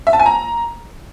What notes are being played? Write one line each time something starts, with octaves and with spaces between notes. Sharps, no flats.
E5
A5
G#5
A#5